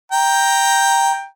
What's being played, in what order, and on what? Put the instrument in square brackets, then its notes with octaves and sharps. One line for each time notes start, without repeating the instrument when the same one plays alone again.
[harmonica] G5 A#5